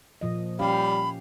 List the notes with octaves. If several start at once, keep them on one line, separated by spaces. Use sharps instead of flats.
A#2 F3 D#5
G3 C#4 G4 F5 B5